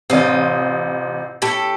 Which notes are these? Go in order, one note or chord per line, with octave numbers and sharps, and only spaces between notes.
A1 C3 F4 D#5
A2 G4 A4